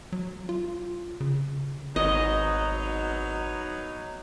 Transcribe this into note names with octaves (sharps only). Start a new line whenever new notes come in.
F#3
F4
C#3
G#1 F#3 B3 D#4 D#5